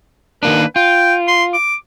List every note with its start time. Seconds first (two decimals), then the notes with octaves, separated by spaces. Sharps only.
0.43 D#3 A#3 D4 B4
0.76 F4 G5
1.28 C6
1.54 D6